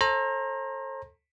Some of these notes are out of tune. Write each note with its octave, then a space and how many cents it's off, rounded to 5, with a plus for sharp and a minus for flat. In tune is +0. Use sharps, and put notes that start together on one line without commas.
A4 +0 C5 +40 A#5 +0